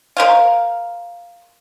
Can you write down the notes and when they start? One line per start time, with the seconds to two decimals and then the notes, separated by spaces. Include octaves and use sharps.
0.17 A#4 C5 F5